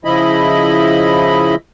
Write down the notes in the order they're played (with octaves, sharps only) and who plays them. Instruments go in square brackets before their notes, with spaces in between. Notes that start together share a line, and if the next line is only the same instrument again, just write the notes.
[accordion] C#3 F3 E4 D#5 B5